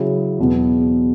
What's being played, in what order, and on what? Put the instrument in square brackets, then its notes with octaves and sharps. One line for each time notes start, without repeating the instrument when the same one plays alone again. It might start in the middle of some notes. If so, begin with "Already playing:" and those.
Already playing: [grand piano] C#3 F#3 E4
E2 B2 F#3 B3